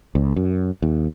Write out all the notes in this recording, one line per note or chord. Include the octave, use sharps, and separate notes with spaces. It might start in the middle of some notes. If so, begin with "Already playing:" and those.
C#2
F#2
D#2